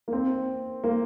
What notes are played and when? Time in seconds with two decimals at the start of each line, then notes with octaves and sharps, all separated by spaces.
0.08 A#3
0.12 C4
0.84 A#3